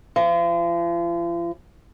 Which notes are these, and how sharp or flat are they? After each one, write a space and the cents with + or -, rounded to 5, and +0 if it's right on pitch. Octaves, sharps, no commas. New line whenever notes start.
F3 -40